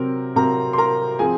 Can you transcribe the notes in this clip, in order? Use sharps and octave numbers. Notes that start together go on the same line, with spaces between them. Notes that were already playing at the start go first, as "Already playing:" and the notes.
Already playing: C3 F#3 C4 A#4
C3 F#3 C4 A#4 A#5
C6
A#4 A#5
F3 C4 G#4 G#5